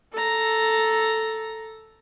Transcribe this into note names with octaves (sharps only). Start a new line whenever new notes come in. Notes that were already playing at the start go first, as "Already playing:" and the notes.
A4 A#5